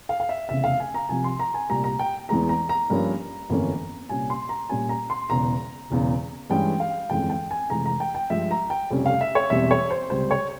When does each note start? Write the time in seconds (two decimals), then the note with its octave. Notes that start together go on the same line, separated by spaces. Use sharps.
0.09 F5
0.20 F5
0.29 E5
0.49 F1 E2 C#3 E5
0.64 F5
0.80 G#5
0.94 A#5
1.09 C2 C3 F3 G#5
1.24 C6
1.40 A#5
1.54 G#5
1.69 C2 A#2 G3 A#5
1.84 A#5
1.99 G5
2.29 E2 E3 G#3 A#5
2.49 A#5
2.69 A#5
2.90 G2 F3 A#3 C#4
3.50 G1 F2 E3 A#3 C#4
4.09 C2 A#2 G3 C#4 G#5
4.30 C6
4.49 A#5
4.69 A#1 A#2 G3 C#4 G#5
4.89 A#5
5.10 C6
5.30 E1 E2 C#3 A#5
5.90 E1 E2 C#3
6.50 G2 E3 G#3 C#4 G5
6.80 F5
7.10 G1 F2 E3 G#3 C#4 G5
7.30 G5
7.51 G#5
7.70 F1 F2 E3 G#3 A#5
7.86 A#5
8.00 G5
8.15 G5
8.30 G2 F3 G#3 E5
8.51 A#5
8.70 G5
8.90 F1 F2 C#3 G3 C#4
9.06 F5
9.21 E5
9.35 C#5
9.50 E1 E2 E3 G3 C4 E5
9.71 C#5
9.90 C5
10.10 C#2 C3 G3 C4 C5
10.31 C#5